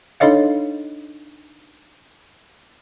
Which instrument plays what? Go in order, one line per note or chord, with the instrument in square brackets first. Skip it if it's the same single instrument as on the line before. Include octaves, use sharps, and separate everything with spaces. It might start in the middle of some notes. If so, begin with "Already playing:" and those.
[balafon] D4 D#4 A4 C#5 D#5 F5